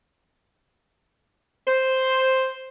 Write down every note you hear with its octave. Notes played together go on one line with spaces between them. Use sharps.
C5